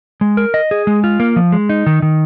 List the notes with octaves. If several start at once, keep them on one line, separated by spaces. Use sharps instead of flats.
G#3
A#4
D#5
G#4
G#3
F4
A#3
F3
G#3
D#4
D#3
D#3